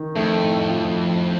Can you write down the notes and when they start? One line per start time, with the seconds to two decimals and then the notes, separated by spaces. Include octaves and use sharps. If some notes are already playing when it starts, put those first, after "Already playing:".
Already playing: D#3
0.15 F2 A3
0.42 A2
0.70 F3